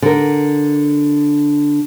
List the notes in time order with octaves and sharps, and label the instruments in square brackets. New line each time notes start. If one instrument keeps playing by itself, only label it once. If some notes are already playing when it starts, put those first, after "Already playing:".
[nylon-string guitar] D3 A#4